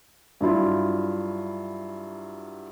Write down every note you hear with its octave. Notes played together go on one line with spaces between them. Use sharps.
G2 F#3 E4 F4